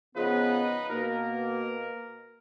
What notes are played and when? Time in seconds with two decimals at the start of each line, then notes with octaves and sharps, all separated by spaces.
0.16 C#3 F3 B3 D#4 B4 D#5
0.89 B2 A#3 A#4